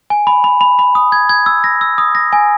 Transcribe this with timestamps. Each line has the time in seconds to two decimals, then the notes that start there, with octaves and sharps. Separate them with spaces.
0.10 G#5
0.27 B5
0.44 B5
0.61 B5
0.79 B5
0.95 D#6
1.12 G#6
1.29 G#6
1.46 E6
1.64 A#6
1.81 E6
1.98 D#6
2.15 A#6
2.33 G#5